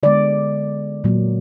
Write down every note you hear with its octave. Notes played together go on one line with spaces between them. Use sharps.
D3 G#3 B3 D5
A#2 F#3 A#3